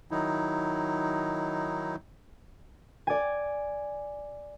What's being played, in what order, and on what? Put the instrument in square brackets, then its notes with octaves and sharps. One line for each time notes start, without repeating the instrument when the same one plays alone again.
[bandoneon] D#3 F#3 D#4 E4
[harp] D5 G#5